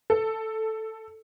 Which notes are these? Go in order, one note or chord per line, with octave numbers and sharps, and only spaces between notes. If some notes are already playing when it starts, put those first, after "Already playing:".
A4